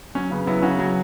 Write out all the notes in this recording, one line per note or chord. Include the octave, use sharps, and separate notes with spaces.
F#3 C#4
C#3 B3
F#3 B3 E4
C#3 C#4 F#4
F#3